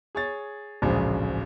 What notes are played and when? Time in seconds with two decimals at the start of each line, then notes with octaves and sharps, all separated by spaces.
0.15 G#4 C#5 A6
0.82 D1 A#1 G#2 C#3 G#4